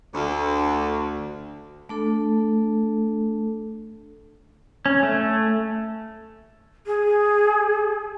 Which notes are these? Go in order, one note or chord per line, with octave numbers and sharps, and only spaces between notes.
D2
A3 D4 A4
C#4
A3
G#4